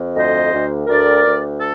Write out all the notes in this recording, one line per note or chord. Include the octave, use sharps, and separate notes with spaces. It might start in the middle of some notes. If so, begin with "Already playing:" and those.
Already playing: F2
D2 C5 D#5
D2
D2 A#4 D5
D2
A4